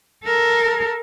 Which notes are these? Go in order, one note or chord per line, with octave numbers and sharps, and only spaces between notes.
A4 A#4